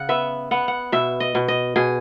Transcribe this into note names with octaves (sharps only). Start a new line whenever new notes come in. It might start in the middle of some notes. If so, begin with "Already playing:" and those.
Already playing: C#3 F#5
B3 E5
B3 F#5
F#5
B2 E5
D#5
B2
D#5
B2 G#4